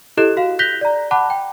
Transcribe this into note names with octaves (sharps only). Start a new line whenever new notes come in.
E4 G4 A4 D#5 F#6 E7
F#4 F5
F#6 G6 A#6 B6 F7 G7
D5 A#5
F#5 A5 B5 D6 F#6
G5